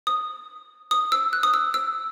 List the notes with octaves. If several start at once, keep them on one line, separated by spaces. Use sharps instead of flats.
D#6
D#6
E6
F#6
D#6
E6
E6